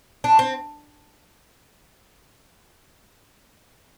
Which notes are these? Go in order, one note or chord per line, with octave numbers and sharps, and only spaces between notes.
D4
C4